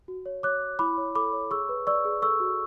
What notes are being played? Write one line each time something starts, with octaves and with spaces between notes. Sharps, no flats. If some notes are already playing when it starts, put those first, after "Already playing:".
F#4
C#5
C#5 D6 F#6
C#5
E4 B5 D6
C#5
A4 B5 D6
C#5
G#4 C#6 E6
B4
D5 C#6 E6
G#4
A4 C#6 E6
F#4